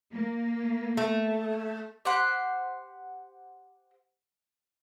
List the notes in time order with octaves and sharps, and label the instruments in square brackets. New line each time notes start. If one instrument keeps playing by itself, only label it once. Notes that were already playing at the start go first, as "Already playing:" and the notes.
[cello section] A#3
[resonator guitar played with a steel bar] A3
[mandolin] G4 C5 F#5 C6